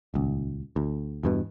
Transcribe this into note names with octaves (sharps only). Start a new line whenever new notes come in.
D#1 C#2
D2
E2 G2 B2